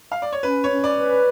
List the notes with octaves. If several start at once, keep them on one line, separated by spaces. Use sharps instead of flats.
F5
D5
C#5
C#4 B4
C#5
C#4
D5
B4